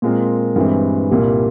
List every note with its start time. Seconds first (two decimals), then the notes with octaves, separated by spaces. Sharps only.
0.02 A#2 G#3 C4 F4 A#4
0.56 G2 E3 G#3 C4
1.10 C2 A#2 G3 A#3